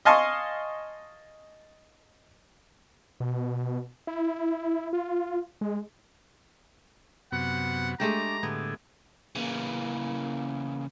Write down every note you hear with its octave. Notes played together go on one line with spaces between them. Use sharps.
D#5 F5 G#5 A5 C6 C#6
B2
E4
F4
G#3
F#2 C3 B3 F#5
G#3 A3 D4 G4 A#5
A2 D3 B3 G#4
C#3 E3 A#3